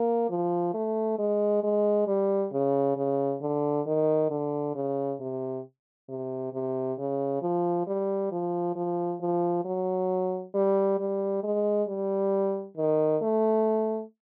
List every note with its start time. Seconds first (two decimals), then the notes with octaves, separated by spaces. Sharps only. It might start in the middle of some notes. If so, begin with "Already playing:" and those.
Already playing: A#3
0.30 F3
0.74 A3
1.19 G#3
1.64 G#3
2.07 G3
2.52 C#3
2.96 C#3
3.41 D3
3.87 D#3
4.31 D3
4.75 C#3
5.20 C3
6.09 C3
6.53 C3
6.98 C#3
7.42 F3
7.87 G3
8.32 F3
8.76 F3
9.21 F3
9.65 F#3
10.54 G3
10.99 G3
11.43 G#3
11.88 G3
12.77 D#3
13.22 A3